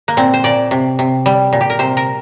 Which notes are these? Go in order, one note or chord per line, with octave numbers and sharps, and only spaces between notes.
A#3
A#2 C4
C5
A#2 D5
C3
C3
G3
A#2
G4
A#4
C3 C5
A#4